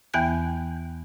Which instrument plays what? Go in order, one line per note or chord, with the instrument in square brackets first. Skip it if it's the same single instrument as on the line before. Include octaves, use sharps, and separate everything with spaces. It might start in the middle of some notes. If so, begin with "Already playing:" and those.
[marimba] E2 E3 B3 G5 F#6 G6